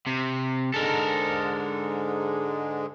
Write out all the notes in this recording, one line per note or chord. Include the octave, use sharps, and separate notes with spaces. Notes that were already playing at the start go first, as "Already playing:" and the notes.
C3
G#2 D3 G#3 A4 A#4